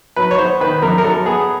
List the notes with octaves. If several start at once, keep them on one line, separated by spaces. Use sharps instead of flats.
F#3 B4
C#5
B3 C5
D#3 B4
F#2 A#4
A#4
F#3 A4
B3 G#4